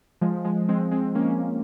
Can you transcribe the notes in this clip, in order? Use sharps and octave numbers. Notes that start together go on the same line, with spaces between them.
F3 G#3
F3 G#3
G#3 C4
G#3 C4
A#3 C#4